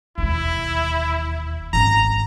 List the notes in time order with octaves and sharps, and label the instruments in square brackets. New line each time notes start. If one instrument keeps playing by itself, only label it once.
[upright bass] E1 D#2 [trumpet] E4
[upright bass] G#1 C#4 [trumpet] A#5